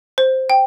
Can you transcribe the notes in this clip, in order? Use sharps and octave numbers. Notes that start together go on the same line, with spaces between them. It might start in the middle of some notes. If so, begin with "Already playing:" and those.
C5
G5